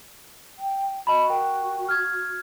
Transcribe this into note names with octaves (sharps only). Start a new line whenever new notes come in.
G5
F#4 D#5 A5 B5
A#4 G5
F6 G#6